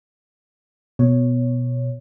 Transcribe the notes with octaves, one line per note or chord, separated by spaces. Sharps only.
B2 C#5